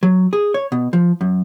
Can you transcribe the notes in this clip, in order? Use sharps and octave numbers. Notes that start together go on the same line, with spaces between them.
F#3
G#4
C#5
B2
F3
F#2